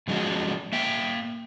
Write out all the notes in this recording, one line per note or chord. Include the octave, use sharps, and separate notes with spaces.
A2 F3 G#3 C4 C#4 F#4
A#3 E5 G5